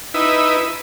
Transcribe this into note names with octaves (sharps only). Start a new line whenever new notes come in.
D#4 E4 B4